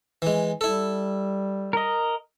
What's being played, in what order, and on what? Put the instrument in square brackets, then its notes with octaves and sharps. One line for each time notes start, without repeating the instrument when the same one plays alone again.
[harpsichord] E3 G#3
[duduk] G3 [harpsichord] E4 A4
[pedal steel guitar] A#4 D#5